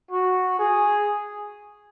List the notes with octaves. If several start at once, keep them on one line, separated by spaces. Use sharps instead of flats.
F#4
G#4